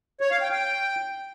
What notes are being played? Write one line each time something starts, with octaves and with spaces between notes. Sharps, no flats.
C#5
F5
G5
G5